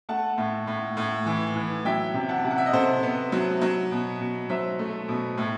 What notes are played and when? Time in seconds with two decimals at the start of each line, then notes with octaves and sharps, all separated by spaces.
0.09 A3 F#5 A5
0.38 A2
0.67 A2
0.97 A2
1.26 E3
1.56 E3
1.85 F#3 E5 G5
2.14 C3
2.29 F#5 A5
2.44 C3
2.51 F#5
2.58 E5
2.66 D#5
2.73 C3 A4 C5
3.03 B3
3.32 F#3
3.62 F#3
3.91 B2
4.21 B2
4.49 F#3 C5 E5
4.79 A3
5.08 B2
5.37 A2